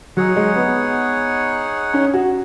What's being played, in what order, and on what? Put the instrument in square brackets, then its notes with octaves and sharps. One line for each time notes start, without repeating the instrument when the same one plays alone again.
[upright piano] F#3 [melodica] D#4 G#4 C#5 F#5
[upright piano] G#3
B3
C#4
F#4